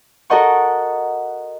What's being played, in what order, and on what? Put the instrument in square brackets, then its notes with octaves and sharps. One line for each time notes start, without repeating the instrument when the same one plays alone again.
[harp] F#4 A4 A#4 D#5 F#5 C#6